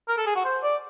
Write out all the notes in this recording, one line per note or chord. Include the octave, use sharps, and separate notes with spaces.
A#4
A4
G#4
F#4
C5
D5